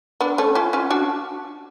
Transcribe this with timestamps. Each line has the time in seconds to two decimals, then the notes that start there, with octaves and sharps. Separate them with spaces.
0.21 B3 D4
0.38 A3 C#4
0.55 C#4 F4
0.73 C#4 F4
0.90 D4 F#4